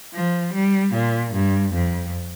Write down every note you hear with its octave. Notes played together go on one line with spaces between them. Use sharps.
F3
G3
A#2
G2
F2